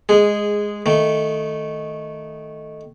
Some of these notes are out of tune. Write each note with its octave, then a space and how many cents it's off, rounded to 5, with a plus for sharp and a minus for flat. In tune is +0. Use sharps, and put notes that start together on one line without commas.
G#3 +0 G#4 -10
D#3 +0 A3 +0